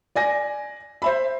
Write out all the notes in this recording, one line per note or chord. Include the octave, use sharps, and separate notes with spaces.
D5 G#5 A#6
C5 E5 B5